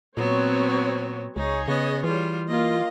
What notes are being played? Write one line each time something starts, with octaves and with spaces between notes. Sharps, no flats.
A#2 F#3 B3 C4 C#5
C#2 D#4 G#4 C#5
C#3 B3 D#5
E3 G3 F4
A#3 F4 D#5